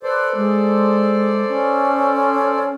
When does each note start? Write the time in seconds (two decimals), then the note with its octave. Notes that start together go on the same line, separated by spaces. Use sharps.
0.03 A4 B4 C5 D5
0.36 G#3
1.48 C#4